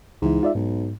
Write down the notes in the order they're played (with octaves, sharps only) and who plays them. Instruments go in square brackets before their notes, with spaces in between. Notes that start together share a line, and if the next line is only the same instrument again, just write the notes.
[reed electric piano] C#2 E3 E4 [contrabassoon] G#2
[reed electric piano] F4 D5 E5
[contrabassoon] B1 [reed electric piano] G#2